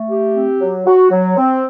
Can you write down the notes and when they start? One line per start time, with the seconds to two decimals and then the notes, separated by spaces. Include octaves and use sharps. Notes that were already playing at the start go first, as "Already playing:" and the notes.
Already playing: A3
0.09 G4
0.34 C4
0.60 F#3
0.86 F#4
1.11 F#3
1.37 C4